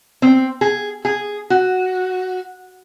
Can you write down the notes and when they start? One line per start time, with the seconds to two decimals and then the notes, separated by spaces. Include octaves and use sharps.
0.22 C4
0.61 G#4
1.05 G#4
1.50 F#4